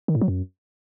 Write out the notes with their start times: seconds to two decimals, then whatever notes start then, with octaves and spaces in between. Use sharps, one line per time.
0.08 D#3
0.15 A2
0.21 F#3
0.28 F#2